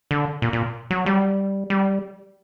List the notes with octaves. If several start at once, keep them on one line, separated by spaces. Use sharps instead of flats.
D3
A#2
A#2
F#3
G3
G3